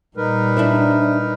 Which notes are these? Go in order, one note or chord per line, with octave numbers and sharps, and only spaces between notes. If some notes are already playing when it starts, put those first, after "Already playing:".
A#2 G3 D#4 A#4 B4
D4 E4 C5